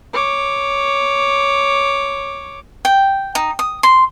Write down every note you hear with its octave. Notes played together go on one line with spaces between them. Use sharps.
C#5 D6
G5
D#4
D#6
C6